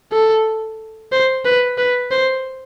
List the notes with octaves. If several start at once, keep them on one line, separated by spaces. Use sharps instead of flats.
A4
C5
B4
B4
C5